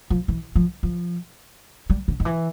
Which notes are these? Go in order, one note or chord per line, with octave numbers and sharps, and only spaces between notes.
F3
E3
F3
F3
G3
D3
D#3
E3